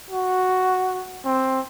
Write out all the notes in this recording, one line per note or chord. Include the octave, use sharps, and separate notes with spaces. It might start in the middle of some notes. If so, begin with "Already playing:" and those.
F#4
C4